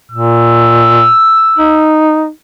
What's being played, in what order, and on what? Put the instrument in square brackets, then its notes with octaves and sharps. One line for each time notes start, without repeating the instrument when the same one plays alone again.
[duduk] A#2 [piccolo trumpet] E6
[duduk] D#4